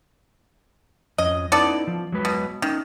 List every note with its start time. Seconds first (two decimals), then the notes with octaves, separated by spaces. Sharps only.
1.18 F2 C#4 D#5
1.52 B3 C#4 D#4 E4 A4 D5
1.87 F3
2.12 F#3 G#3 B4
2.25 B2
2.62 D#3 C#4 D#4